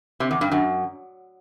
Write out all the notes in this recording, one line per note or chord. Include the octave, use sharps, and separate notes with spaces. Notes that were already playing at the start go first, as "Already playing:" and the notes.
C3
E2
G2
F#2